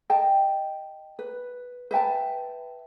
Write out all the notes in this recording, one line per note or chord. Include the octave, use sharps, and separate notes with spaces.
D#5 G5 A5
B4
B4 E5 G5 A5